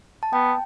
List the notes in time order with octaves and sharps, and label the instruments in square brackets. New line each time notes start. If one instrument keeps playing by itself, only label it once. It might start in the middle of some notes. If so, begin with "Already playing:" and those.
[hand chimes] A5
[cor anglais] B3 [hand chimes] G5